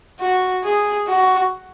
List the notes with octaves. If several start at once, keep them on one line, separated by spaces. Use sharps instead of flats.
F#4
G#4
F#4